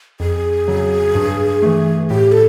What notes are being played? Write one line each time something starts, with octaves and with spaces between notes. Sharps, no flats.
F2 G#4
C#3 F#3
G2
E3 A3
A2 G4
A4